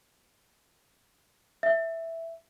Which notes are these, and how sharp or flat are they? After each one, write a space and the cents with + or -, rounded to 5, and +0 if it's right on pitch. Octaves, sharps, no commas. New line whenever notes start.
E5 +0